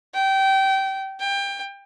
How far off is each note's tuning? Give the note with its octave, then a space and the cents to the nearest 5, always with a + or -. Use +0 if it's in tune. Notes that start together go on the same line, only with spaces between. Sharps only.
G5 -25
G5 +25